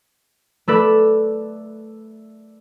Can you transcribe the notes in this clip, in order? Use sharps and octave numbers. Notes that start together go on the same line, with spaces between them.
A3 A4 B4 D5